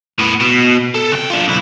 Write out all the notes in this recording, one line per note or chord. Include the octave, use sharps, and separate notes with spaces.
A2 B3
B2
A4
C3 G5
D4 F4
B1 E4